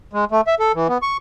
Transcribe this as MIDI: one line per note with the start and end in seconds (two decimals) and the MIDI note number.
0.13 0.25 56
0.32 0.41 57
0.47 0.55 76
0.60 0.72 69
0.75 0.87 52
0.89 0.98 59
1.02 1.17 85